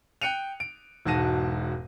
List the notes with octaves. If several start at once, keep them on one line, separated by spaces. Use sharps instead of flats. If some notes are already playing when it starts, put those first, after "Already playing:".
G5 F#6 C#7 D#7 F7
D7
E1 G#2 F#4 A5 A#6 D#7